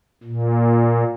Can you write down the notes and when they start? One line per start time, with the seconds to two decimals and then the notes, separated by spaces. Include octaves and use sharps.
0.24 A#2